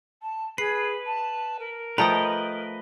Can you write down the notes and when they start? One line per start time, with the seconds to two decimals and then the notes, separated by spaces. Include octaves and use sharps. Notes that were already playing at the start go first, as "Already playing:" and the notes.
0.22 A5
0.58 G#4 B4 C7
1.06 A5
1.59 A#4
1.98 F3 A3 B4 D#5 G5 A#5 D#6